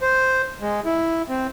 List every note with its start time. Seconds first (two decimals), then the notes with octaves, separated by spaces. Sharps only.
0.02 C5
0.61 G#3
0.85 E4
1.29 C4